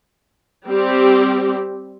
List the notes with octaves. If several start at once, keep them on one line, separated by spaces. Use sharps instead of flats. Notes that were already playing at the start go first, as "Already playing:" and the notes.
G3 C4 G4